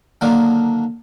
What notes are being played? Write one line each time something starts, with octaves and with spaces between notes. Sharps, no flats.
D3 D#3 F#3 A#3 D4 D#4